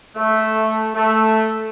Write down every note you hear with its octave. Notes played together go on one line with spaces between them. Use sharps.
A3
A3